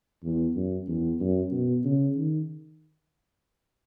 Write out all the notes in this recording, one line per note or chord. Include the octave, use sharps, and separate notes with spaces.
E2
F#2
E2
F#2
B2
C#3
D#3